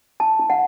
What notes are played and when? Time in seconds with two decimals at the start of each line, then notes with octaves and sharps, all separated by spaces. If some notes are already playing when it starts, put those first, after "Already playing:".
0.20 E4 A5
0.40 E4
0.50 F#5